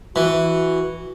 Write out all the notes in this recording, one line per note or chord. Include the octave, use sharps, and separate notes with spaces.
E3 F#4